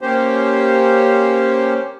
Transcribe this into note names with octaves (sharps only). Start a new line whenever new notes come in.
A#3 C#4 G4 C5